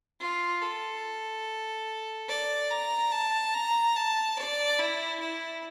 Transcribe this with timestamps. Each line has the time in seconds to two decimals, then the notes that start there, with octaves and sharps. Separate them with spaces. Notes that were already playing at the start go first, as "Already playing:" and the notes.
0.21 F4
0.62 A4
2.29 D5
2.71 A#5
3.11 A5
3.54 A#5
3.95 A5
4.37 D5
4.79 E4
5.20 E4